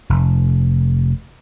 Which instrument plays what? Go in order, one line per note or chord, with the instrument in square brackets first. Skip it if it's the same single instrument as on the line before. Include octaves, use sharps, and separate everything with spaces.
[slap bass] F1